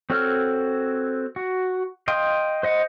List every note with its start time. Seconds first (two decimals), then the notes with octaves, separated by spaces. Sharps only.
0.10 C4 F#4 A4 C#5 F6
1.36 F#4
2.08 D#5 F5 G5 C6
2.63 C5 D#5 F#5